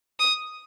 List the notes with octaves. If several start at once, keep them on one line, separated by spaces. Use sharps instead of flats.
D#6